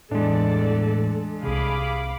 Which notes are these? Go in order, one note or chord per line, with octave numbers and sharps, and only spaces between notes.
E2 A2 G#3 D4 A4 D5
C2 C3 G#4 F5 B5 D6